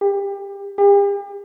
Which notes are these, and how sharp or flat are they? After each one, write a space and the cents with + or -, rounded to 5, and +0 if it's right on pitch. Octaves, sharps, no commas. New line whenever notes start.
G4 +25
G4 +40